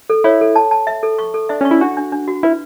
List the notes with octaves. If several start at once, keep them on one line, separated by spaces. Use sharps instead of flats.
A4
E4 C#5
A4
A5
A5
E5
A4
C#6
A4
D4 E5
C#4
C#6
E4
D4 F#4
D4
D4
F#4
E4 B4